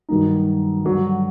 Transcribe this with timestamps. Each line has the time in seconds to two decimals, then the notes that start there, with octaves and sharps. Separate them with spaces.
0.09 G2 D#3 F#3 A#3 D#4
0.85 G2 D3 F#3